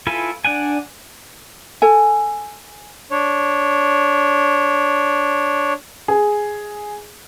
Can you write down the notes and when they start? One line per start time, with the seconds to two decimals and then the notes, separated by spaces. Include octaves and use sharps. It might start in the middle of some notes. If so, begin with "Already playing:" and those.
0.07 E4 F4 A4 B4 G#5
0.45 D4 D5 F#5 G#5
1.82 A4 G#5
3.11 D4 C#5
6.08 G#4